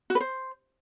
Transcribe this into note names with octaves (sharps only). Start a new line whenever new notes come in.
F#4
B4
C5